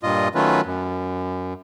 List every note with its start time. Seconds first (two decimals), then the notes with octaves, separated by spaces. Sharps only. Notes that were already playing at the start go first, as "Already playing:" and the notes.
0.03 G2 A#2 F4 D#5
0.35 D#3 F#3 A3 C#4 F4 B4
0.66 F#2